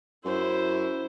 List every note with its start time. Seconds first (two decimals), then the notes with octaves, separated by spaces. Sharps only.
0.25 F#2 E4 C5